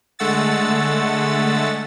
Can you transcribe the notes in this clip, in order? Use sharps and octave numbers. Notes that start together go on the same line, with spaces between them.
D3 G#3 A3 F#5 E6 A6